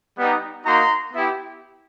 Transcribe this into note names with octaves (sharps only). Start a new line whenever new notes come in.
G3 B3 D#4
A#3 D#4 F#4 A#5 C6
B3 E4 G4